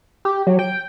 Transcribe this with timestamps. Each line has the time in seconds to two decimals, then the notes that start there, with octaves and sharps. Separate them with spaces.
0.25 G4
0.47 F#3
0.59 G5